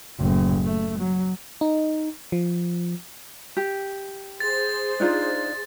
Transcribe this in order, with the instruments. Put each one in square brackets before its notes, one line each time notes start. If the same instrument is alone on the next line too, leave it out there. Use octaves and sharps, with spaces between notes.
[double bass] F#1 A2
A3
F#3
[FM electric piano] D#4
F3
[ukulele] G4
[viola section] G#4 C5 [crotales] A6
[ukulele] D4 D#4 F4